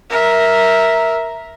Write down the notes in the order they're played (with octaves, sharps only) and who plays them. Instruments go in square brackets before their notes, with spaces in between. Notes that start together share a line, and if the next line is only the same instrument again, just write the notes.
[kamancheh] A#4 E5